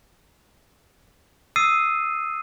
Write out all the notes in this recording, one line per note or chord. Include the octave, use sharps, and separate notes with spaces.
D#6 E6 A6 C7 D#7